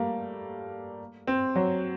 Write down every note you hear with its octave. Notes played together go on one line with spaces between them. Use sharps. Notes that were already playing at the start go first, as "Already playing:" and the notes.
Already playing: G3 A3 A#3
C4
F#3